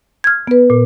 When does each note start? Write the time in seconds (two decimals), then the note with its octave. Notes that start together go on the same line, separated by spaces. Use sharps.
0.24 F6 G#6
0.47 B3 B4
0.70 A#2